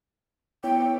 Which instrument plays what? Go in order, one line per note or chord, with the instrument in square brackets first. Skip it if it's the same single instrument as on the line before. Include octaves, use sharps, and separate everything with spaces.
[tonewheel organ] B3 E4 C#5 [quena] G5